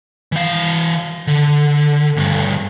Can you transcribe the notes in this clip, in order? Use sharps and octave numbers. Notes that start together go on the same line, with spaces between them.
E3 F5
D3
D2 G2